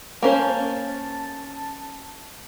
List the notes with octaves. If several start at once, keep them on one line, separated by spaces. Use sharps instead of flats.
A#3 C#4 C5 A5